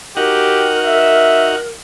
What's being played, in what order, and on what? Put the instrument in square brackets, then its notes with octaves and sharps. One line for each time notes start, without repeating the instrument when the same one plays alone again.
[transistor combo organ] D#4 F#4 F#5 [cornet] G4 [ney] A#4
[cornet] E5